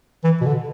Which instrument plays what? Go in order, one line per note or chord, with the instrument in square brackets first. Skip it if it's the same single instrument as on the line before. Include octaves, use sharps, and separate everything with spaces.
[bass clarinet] E3
B2
D3